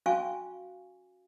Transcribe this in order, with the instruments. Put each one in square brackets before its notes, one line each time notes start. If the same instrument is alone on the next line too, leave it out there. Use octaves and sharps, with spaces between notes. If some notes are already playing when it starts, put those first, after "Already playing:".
[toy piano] C#4 F#4 F5 G#5 C#6